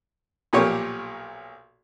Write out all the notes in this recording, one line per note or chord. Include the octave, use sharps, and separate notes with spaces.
B1 A#2 F3 G4 C#5 D6